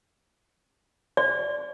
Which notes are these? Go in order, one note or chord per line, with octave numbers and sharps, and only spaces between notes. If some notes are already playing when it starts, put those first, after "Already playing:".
D5